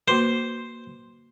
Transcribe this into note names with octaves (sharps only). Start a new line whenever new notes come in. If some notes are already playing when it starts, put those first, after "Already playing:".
A#3 F#4 B4 C5